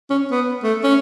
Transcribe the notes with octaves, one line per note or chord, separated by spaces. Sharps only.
C#4
B3
A3
C#4